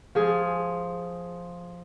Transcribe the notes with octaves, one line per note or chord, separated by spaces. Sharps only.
F3 G#4